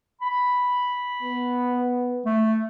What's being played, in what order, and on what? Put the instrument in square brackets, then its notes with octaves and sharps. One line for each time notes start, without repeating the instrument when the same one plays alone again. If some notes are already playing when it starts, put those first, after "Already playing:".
[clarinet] B5
[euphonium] B3
[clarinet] A3